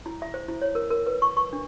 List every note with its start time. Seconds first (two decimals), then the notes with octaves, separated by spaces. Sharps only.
0.06 E4
0.22 E5
0.34 C5
0.48 E4
0.62 C#5
0.75 A#4
0.90 A#4
1.07 B4
1.22 C#6
1.37 C#6
1.53 D4